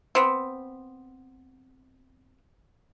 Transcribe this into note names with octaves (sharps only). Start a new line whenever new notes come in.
B3 C4